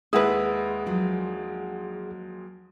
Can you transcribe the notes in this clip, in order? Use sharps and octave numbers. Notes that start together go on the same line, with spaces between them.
D#2 G#3 E4 G#4 B4 F#5 D#6
F3 F#3 D4